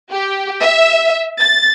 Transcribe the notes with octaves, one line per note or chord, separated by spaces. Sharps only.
G4
E5
A6